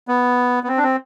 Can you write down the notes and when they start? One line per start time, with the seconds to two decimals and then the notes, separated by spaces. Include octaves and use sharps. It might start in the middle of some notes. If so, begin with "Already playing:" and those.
0.08 B3
0.63 B3
0.68 C4
0.77 D4
0.83 C4